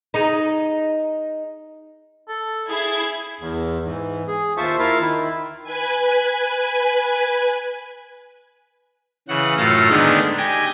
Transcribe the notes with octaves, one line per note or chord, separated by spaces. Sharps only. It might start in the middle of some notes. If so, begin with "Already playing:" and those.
D#4 G#4
A4
E4 G#4 G#6 C7
E2
G#2 E3
G#4
D#2 F4 C5 E5 A5 C#6
E4 F4 A#4 F5
D#3 E4
B4 G#5
C#3 E3 F#5
F#2 A2 F4 A4 A#5
D3 D#3 G#3 B3 D4 D#4
G4 D#5 G5 G#5